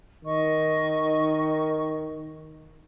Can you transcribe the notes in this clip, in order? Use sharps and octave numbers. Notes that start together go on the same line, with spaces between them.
D#3 D#5 C#6